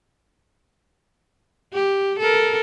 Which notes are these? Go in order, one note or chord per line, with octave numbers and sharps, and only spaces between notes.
G4
A4 A#4